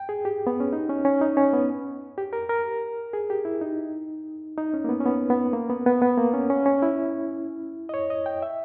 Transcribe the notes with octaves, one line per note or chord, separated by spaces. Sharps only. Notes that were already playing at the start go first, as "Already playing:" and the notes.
Already playing: G5
G#4
G4
B3
C#4
D#4
C#4
C#4
D#4
C#4
B3
G4
A#4
A#4
G#4
G4
E4
D#4
D#4
C#4
A#3
B3
C#4
B3
B3
A#3
B3
B3
B3
A#3
C#4
C#4
C#4
E4
D#5
C#5
D#5
G5
E5